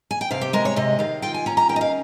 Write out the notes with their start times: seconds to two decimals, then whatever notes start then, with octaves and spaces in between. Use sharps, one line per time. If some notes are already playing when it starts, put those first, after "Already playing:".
0.11 G#5
0.21 G5
0.31 C3 F5
0.41 G4
0.53 G#3 A#4
0.65 C#5
0.76 C3 D#5
0.99 D#3 F5
1.22 F4 G5
1.34 G#5
1.46 C#4 A#5
1.57 A#5
1.69 D#3 G5
1.76 D#5
1.81 F5